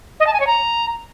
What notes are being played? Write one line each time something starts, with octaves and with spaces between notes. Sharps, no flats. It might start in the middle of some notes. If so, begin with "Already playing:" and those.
D#5
A5
G#5
C#5
A#5